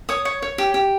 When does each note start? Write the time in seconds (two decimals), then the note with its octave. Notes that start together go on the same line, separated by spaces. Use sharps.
0.09 C#5 D#6
0.25 C#5
0.42 C#5
0.58 G4
0.74 G4